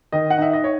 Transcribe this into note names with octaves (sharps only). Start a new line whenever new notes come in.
D#3 D#5
F#5
D#4 E5
D#5
C#5